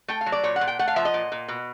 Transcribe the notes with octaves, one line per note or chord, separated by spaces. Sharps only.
A3 G5
F5
F#3
D5
A#2 C#5
F#5
A#2
G5
A3 F#5
F5
F3 E5
D#5
A#2
A#2
B2